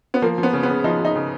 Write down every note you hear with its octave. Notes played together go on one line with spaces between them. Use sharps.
B3
F3 A#3
F3
B3
C#3
B3
C#3
F3 D#4
F3 D#4
C#3